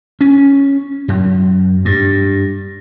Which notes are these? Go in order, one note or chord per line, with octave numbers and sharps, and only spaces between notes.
C#4
F#2
G2